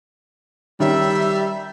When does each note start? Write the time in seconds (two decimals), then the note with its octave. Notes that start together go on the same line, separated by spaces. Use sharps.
0.80 D#3 G3 C#4 E5